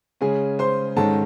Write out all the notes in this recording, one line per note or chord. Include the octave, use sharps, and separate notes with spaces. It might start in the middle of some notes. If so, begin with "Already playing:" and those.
C#3 G#3 C#4 G#4 G#5
C5 C6
G#2 D#3 G#3 C#4 A4 A5